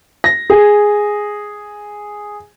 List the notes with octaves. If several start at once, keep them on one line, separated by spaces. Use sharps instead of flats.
A#6
G#4